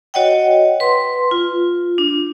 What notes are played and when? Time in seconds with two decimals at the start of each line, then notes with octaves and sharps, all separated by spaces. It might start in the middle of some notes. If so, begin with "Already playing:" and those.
0.14 F#4 C#5 D#5 F#5 G5
0.80 B4 C6
1.31 F4
1.98 D4